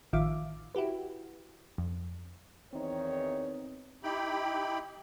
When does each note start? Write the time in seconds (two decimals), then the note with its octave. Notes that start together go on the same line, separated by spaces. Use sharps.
0.13 A1 D#3 F3 E5 F5 D6
0.75 E4 F#4 G4 B4
1.78 F2
2.73 E2 D#3 C4 D#4 C#5
4.03 D#4 E4 G4 G5 B5